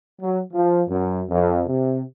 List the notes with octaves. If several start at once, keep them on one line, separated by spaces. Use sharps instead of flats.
F#3
F3
F#2
F2
C3